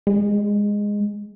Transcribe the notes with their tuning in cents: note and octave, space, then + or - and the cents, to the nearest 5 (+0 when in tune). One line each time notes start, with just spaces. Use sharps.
G#3 -10